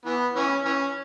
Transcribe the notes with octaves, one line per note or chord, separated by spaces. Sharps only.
E3 B3
E3 C#4
E3 C#4